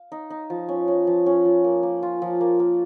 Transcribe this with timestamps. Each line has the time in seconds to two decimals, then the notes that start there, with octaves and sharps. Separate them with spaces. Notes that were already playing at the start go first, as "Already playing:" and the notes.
Already playing: F5
0.12 D#4
0.30 D#4
0.50 F3
0.69 C#4
0.88 C#4
1.07 F3
1.26 C#4
1.45 F3
1.64 A#3
1.83 A#3
2.03 F4
2.22 F3
2.41 A#3
2.60 A#3